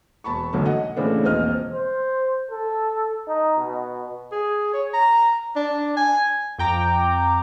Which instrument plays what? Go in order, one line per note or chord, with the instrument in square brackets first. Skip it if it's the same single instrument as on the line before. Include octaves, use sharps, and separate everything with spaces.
[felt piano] E1 A5 B5 C#6
B1 F#2 D3 A3 A4
D#5 F#5
A2 C#3 E3 C4 D4 A4
E1 A#1 C4 D#5 F6
[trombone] C5
A4
D#4
B2
[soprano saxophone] G#4
C#5
A#5
D4
G#5
[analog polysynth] F2 G5 A#5 D6